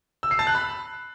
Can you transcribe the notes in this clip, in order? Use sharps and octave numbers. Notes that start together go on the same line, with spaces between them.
E6
C7
A5
F#6
B5